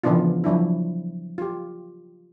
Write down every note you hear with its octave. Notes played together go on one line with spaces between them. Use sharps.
C#3 E3 F3 B3 D4 F4
F3 F#3 D4 E4
F4 G4